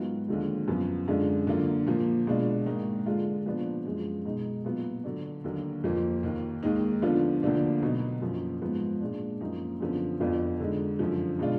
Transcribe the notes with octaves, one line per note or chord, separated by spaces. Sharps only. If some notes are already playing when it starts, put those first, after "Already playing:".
Already playing: G#2 D#3 F#3 B3 F4
D#2 D3 F3 G#3
F#2 F3 B3
F#2 D3 G#3 D4 F4
D3 F#3 A#3 F4
A#2 F3 A#3
B2 G#3 D4 F4
G#2 D#3 A#3 D#4
D3 G#3 D4 F4
A#2 F3 B3 D4
F#2 F3 G#3
B2 G#3 D#4
A#2 F#3 B3 F4
D3 F#3 D4
D#2 D3 F#3 A#3
F2 F3 A#3 F4
D#2 D#3 A#3
D#2 D#3 G#3 D#4
D3 F3 B3 D4 F4
D2 D3 F3 A#3 D4
B2 F#3 B3 D#4
F#2 F3 A#3
G#2 F3 B3
A#2 G#3 D4
F#2 F3 A#3 D#4
F#2 D3 F3 B3
F2 F3 B3 D4 F4
D3 G#3 D#4
F#2 D3 F3
B2 G#3 D4 F4